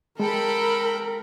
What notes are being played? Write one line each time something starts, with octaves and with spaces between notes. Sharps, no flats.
G#3 A4 A#4 G5 B5